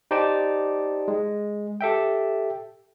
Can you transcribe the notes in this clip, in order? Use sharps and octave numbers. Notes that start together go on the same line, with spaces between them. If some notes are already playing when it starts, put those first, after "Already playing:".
D#4 G4 C5 D5 G5 A5
G#3
G4 A4 E5 G5